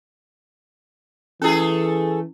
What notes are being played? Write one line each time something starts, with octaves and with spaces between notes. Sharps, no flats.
E3 A3 C#4 E4 G#4 A4